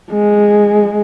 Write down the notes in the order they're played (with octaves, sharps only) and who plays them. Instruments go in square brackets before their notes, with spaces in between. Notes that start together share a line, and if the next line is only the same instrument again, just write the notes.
[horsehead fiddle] G#3